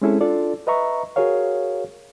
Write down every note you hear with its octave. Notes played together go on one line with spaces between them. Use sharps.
G#3 C4 C#4 E4 G#4 A4
D4 F4 A4 D5
B4 D#5 E5 A#5 C#6
F#4 G#4 A#4 C#5 F5